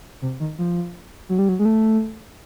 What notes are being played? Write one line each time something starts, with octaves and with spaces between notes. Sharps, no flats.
C3
D#3
F3
F#3
G3
F#3
G#3
A3